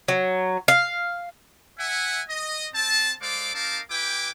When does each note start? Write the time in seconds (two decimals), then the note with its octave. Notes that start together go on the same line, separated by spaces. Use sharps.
0.08 F#3
0.68 F5
1.79 E5 F#5 G#5
2.29 D#5
2.74 C4 A5
3.22 G#3 A4 C5 D5 F5 D6
3.54 C4 D#4 A#4 F5 A5 D6
3.91 E4 G4 B4 G5 G#5 D6